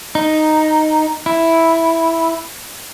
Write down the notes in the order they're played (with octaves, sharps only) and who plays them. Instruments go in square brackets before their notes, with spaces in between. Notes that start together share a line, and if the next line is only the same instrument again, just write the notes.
[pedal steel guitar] D#4
E4